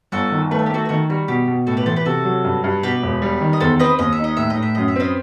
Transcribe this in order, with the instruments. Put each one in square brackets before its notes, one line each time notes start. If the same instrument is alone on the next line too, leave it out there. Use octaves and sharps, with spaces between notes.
[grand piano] G1 [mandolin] F#4 A4
[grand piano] D#3
[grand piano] A3 [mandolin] B4
[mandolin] A4
G4
[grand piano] A3 [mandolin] F#4 A4
[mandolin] B4
[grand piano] D#3 [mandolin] F#4 A4
[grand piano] G3 [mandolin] F#4
[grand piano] B2 [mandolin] G4
[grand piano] B2
[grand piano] A2 [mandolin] F#4 A4
[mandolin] G4 B4
[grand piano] E3 [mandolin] A4 C5
[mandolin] G4 B4
[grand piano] C3 [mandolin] F#4 A4
[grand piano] F#3
G2
G2
[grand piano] B2 [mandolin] G4 B4
[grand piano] E1
G3
D#3
[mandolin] D#5
[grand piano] E2 [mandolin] A4 C5
[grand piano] C4 [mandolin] B4 D#5
[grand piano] D#2 [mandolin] D#5
[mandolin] E5
[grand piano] D#4
[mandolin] D#5
[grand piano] A2 [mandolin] E5
[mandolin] D#5
[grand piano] A2
[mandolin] E5
[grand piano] F#2 [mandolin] D#5
[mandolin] E5
[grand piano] C4 [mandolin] B4 D#5